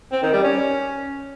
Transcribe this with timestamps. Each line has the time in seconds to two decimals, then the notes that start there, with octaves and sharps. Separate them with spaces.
0.12 C4
0.22 D#3
0.33 G3
0.44 C#4